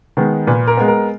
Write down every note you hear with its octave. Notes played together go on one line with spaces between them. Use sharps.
D#3 G#3 B3
A#2 B4
A#4
G#3 B3
A#4